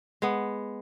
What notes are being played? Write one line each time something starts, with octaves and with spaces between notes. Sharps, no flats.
G#3 B3